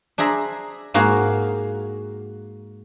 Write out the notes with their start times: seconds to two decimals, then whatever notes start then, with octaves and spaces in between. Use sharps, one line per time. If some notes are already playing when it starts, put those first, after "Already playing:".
0.18 D4 G#4 C5 E5 A#5
0.94 G#2 A#3 F#4 G#4 A#4 F5